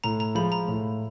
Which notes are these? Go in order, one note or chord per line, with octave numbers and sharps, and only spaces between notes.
A2 A#5
A#5
F3 G#3 B5
A#5
A2